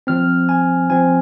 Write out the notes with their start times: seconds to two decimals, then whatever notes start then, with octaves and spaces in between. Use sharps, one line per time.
0.07 F3 C4 F6
0.49 G#5
0.90 F3 C4 G#5